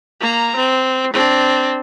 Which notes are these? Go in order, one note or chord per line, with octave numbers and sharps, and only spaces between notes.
A#3 A#5
C4
C4 D4